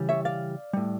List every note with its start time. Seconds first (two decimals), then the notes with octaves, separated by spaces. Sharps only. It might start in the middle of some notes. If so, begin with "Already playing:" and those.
Already playing: C#3 E3 G3
0.09 C#5 E5
0.25 D5 F5
0.73 A2 G3